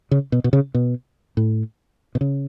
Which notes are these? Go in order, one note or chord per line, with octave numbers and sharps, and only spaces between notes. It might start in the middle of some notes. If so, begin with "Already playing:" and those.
C#3
B2
B2
C#3
B2
A2
B2
C#3